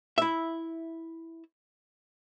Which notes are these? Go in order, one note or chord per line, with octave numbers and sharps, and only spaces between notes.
E4 E5